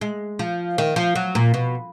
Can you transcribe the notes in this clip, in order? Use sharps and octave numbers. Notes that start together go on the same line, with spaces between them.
G#3
F3
D#3
F3
F#3
A#2
B2